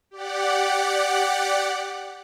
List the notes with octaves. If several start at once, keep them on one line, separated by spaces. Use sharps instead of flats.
G4 D5 F#5